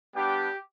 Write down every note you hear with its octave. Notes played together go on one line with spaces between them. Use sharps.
G3 B3 D4 G4